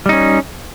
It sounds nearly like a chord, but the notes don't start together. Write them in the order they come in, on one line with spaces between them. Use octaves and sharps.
G3 D#4 C#4